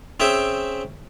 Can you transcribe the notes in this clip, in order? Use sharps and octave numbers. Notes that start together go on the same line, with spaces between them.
C4 C#4 G#4 E5 G5